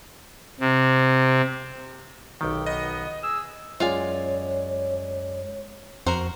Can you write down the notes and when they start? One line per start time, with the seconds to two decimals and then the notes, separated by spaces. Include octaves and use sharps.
0.60 C3
2.41 B1 D#3 G4
2.66 B3 D#5
3.23 G#4 E6
3.80 F#2 G#3 F4 C#5 D5 F5 G#5
6.07 F2 F#4 A#4 C5